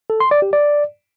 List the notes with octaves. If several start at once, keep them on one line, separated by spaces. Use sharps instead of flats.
A4
C6
D5
G4
D5